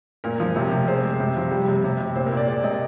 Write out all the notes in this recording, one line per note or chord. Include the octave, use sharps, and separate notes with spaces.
A#2 A#4
F3
C3
C3
G#3 C5
G#3
C3
F3
G3
C3
C3
C3
A#2 C5
A#4
A#2
D5
G#3 D5
C3 D#5